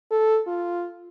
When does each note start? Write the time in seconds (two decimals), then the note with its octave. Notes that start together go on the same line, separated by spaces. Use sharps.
0.11 A4
0.47 F4